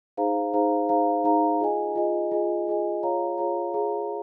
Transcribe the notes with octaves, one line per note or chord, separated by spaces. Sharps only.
D#4 G#4 C5 F5 A#5
D#4 G#4 C5 F5 A#5
D#4 G#4 C5 F5 A#5
D#4 G#4 C5 F5 A#5
F4 G#4 D#5 G#5
F4 G#4 D#5 G#5
F4 G#4 D#5 G#5
F4 G#4 D#5 G#5
F4 G#4 C#5 F5 A#5
F4 G#4 C#5 F5 A#5
F4 G#4 C#5 F5 A#5